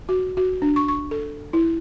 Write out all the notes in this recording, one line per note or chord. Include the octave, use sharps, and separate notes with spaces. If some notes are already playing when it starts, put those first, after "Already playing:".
F#4
F#4
D4
C#6
C#6
A4
E4